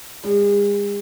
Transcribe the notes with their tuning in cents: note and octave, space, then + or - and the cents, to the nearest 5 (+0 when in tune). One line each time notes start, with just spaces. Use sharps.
G#3 -40